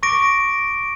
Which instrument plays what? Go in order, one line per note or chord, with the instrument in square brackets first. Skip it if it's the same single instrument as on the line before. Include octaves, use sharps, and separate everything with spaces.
[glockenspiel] C#6 D6 A#6 D7